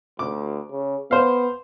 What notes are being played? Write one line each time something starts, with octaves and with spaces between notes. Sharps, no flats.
D2 D6
C#3
B3 C5 F5